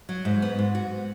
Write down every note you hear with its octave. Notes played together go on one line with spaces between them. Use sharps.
F#3
G#2
B3
G#2
F#4